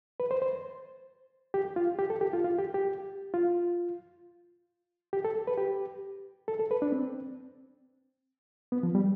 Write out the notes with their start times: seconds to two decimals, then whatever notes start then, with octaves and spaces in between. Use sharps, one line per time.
0.20 B4
0.31 C5
0.42 C5
1.54 G4
1.76 F4
1.99 G4
2.10 A4
2.21 G4
2.33 F4
2.44 F4
2.58 G4
2.74 G4
3.34 F4
5.13 G4
5.25 A4
5.47 B4
5.57 G4
6.48 A4
6.60 A4
6.71 B4
6.82 D4
6.92 C4
8.72 B3
8.83 F3
8.95 G3